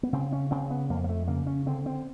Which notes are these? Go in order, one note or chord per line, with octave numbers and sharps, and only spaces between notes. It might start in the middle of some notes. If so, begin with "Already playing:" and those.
B3
C#3 C4
C#4
C#3 C4
B3
F2 A#3
A#3
A3
C#3 A#3
C#4
D3 C4
C4